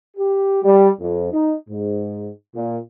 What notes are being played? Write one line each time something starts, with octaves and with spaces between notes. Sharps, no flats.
G4
G3
F2
D#4
G#2
A#2